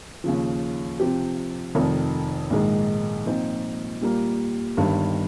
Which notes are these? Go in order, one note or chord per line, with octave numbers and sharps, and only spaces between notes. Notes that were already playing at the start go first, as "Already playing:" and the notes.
D#2 C#3 F3
C3 F3 C4 G4
F1 F2 D#3
A#1 G#2 D#3 G#3
A#2 F3 C4 D#4
A#2 G3 A#3
G1 G2 D#3 G3